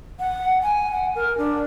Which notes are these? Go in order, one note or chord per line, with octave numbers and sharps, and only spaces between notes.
F#5
G#5
F#5
A#4
D4